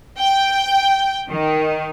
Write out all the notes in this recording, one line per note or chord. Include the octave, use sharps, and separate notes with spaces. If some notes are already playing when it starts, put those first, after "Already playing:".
G5
D#3